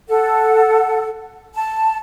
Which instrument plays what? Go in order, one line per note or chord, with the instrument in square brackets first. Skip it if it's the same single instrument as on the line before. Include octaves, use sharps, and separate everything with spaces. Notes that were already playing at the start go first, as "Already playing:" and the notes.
[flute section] A4 F#5
A5